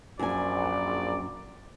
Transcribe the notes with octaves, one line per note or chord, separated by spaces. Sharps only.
A#1 F#2 D5 G#5